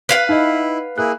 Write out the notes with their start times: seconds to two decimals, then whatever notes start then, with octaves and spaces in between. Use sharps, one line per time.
0.09 B4 F5 F#5
0.29 D#4 E4 D#5
0.98 A#3 E4 G#4 F#6